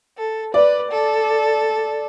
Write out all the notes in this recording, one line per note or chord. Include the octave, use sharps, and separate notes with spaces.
A4
B4 D5
A4